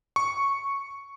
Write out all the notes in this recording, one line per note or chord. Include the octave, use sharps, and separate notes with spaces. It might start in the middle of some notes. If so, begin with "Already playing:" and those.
C#6